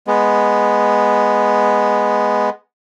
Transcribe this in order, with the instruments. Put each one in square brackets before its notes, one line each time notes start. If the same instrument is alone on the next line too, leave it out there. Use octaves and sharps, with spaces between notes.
[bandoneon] G#3 B3